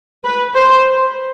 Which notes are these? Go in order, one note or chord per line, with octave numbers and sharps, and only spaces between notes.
B4
C5